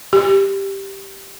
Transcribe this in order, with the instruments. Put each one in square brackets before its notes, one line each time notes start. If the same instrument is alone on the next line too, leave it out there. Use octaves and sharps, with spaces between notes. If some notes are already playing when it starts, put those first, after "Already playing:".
[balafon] G4